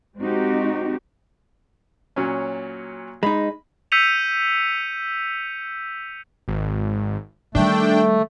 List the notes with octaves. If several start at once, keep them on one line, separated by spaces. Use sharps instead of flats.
G#3 C4 D#4 F#4 G4
A#2 F#3 C#4
G#3 D#4 B5
E6 G6 B6 C#7 D#7 F7
G#1
D#3 G3 A3 D4 G5